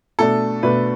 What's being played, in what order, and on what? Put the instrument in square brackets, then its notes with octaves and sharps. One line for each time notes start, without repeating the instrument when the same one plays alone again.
[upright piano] B2 A3 D4 A4
B2 A3 D4 B4